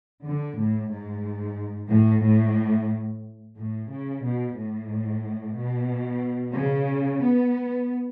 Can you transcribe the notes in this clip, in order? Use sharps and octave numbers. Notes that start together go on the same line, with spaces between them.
D3
A2
G#2
A2
A2
A2
C#3
B2
A2
B2
C#3
B3